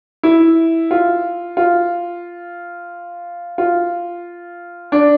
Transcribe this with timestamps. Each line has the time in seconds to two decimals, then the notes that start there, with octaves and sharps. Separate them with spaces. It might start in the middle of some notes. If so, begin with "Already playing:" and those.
0.23 E4
0.91 F4
1.57 F4
3.58 F4
4.92 D4